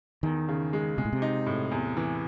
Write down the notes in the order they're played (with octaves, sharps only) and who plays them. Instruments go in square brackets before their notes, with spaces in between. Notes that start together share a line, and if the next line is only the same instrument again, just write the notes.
[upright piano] E2 [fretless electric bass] D#3
[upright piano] C#3
G#3
[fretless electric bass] C3 [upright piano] G#3
[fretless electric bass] A2
C3
[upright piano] D#4
A2
E2
E3